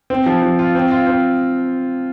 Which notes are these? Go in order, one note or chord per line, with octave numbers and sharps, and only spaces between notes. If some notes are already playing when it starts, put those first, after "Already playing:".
C4
F3
F3
F4
C4
F4
C4